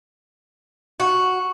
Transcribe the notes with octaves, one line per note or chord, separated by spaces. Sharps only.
F#4